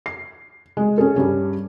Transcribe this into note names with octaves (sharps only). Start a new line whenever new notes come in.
C7
G#3
C#4 G#4 A4
G2 G3 C#4